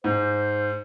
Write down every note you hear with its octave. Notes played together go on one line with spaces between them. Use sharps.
G#2 C5